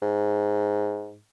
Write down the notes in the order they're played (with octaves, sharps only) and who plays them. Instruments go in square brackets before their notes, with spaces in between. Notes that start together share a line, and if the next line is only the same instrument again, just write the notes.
[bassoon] G#2